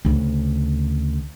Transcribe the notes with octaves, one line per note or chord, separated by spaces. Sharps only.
D2 C#3